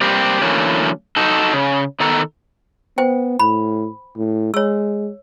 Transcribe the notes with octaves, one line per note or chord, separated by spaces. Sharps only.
G3 A#3 C4 G4
D3 E3 F#3 A3 A#3 C#4
D#4 F#4 A4
C#3
D#3 B3 A4 A#5
B3 C5 G5
A2 B5
A2
G#3 C#5 E6